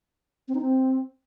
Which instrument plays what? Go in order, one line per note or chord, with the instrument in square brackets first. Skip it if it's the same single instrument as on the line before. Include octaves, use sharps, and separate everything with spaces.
[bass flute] C4
D#4
C4